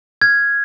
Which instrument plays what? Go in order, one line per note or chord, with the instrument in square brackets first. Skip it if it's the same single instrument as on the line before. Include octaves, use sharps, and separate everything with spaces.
[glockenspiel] F6 G#6